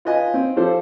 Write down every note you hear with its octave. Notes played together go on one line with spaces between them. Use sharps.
F4 B4 D#5 G#5
C4
F3 G4 A4 C5